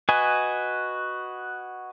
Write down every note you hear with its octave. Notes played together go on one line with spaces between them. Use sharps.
F#4 B4 D#5 G#5